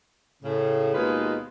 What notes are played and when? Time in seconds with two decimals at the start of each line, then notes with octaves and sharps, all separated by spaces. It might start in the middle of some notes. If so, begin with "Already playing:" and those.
0.43 A2 C#3
0.94 D#2 B2 G#3 D#4 F4 B4